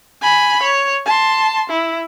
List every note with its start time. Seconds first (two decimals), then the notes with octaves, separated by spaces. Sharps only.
0.21 G#5 B5
0.63 C#5
1.06 A5 C6
1.70 E4